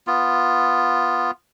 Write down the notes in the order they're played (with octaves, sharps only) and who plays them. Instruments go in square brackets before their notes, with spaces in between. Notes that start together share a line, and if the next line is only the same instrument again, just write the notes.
[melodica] B3 F4